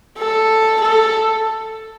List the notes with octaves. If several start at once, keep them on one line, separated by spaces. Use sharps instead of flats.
A4
A4